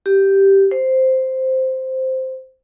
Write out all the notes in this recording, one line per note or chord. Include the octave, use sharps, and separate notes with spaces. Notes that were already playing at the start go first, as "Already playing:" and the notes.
G4
C5